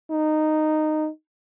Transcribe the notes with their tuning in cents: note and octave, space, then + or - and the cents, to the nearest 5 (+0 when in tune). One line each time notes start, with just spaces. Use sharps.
D#4 -10